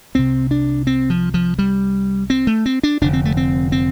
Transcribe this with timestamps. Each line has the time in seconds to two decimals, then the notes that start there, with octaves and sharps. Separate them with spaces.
0.15 C2 C3 C4
0.51 D4
0.87 C4
1.10 F3
1.34 F3
1.59 G3
2.30 C4
2.47 A3
2.66 C4
2.83 D4
3.01 F1 F2 D3 D4
3.13 C4
3.25 A3
3.37 C4
3.72 C4